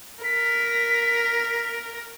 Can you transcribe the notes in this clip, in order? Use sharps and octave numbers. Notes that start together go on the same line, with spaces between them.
A#4 B6